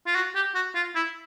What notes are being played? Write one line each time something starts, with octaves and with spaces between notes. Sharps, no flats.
F4
F#4
G4
F#4
F4
E4